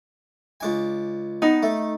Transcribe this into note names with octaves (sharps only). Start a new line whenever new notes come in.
C#2 D4 G#5
B3 D#4
A3